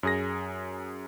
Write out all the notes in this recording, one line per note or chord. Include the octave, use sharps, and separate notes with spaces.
F#2 G#4 A#6